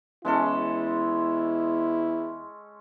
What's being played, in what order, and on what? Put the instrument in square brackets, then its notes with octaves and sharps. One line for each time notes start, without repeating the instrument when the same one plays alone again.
[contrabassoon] E2 [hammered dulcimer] G#3 C#4 A4 [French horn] E4